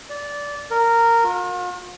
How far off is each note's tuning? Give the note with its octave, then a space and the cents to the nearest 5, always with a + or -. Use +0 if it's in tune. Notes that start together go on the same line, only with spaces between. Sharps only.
D5 -15
A#4 -10
F4 +45